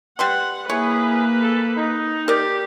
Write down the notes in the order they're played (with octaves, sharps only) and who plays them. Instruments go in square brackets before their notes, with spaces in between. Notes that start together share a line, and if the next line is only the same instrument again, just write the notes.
[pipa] G3 B4 C6 [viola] F#5
[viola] A#3 B4 [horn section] E4 G#4 [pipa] C#5
[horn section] A4
D#4
[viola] G4 [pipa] A#4 D5